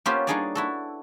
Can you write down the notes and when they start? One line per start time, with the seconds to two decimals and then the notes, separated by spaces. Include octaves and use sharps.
0.05 A#3 B3 C#4 F4 G4 C5
0.27 G3 D4 D#4 G#4 C#5 D5
0.55 E4 F#4 A4